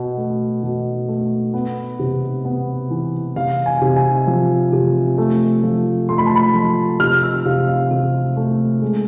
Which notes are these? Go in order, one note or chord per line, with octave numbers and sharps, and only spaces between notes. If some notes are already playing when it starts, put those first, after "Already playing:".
Already playing: B2
A3
B2
A3
B3
C3
B3
E3
C3 F5
G#5
C3
G#5
F3
C3
A3
F3
A3 C6
B5
A5
B5
F3
C3 F6
E6
C3 F5
F5
C3
A3
G#3